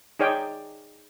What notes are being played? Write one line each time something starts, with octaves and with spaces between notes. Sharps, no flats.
D#4 G#4 C#5 D5 G5